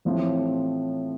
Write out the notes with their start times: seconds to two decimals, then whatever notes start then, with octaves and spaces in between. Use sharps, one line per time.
0.05 A1 A2 F3 A3 C4